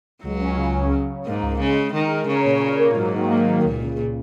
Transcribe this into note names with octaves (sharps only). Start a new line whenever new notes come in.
C#2 F#3
C#4
C#3
C#4
C#3
C#3
G#2 A#3
C#2
C#3 G#3
G#3
D#3 A#4
A#4
C#3 C#5
A#2
C#5
A#3
G#2 F#3
D#3
A#3
D#3
C#2 A#2
C#3